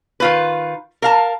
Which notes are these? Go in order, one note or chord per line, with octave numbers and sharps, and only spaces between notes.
D#3 F4 B4
A#4 F5 A5